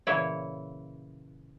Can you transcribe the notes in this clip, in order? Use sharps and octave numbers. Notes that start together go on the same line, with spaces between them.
A#2 C#3 E3 E4 C#5